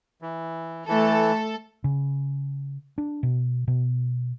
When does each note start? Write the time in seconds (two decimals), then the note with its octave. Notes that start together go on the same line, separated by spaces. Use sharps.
0.22 E3
0.88 E3 A3 A4
1.84 C#3
2.98 D4
3.23 B2
3.68 B2